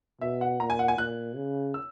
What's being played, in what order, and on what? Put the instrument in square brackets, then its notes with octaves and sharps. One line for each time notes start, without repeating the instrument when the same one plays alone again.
[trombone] B2 [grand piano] E5
[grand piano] F#5
[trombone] A#2 [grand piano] A#5
[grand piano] G#5
F#5
G#5
[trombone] A#2 [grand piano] F#6
[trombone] C#3
[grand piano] E6